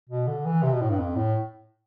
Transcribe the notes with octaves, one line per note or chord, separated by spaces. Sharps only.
B2
D3
E3
C3
B2
A2
G2
F2
A2